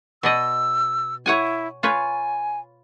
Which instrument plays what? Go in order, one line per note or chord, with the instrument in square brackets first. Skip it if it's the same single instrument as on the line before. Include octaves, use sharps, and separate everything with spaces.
[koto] B2 D5 D#5 [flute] E6
[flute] E4 [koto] C#5 F#5 G#5
[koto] F4 B4 C#5 [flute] G#5